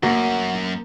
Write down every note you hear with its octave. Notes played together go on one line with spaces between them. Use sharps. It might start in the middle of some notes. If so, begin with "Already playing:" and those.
F#2 A#3 F#4